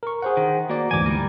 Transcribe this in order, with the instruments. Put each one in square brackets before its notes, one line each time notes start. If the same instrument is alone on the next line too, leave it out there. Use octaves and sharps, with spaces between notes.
[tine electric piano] A#4 C#6
G#4 C5 F#5
[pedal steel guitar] D#3
[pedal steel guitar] A#3 [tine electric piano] F#4 D5
[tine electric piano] D2 G#2 E3 [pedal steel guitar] G#5 D6
[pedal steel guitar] G3 A#4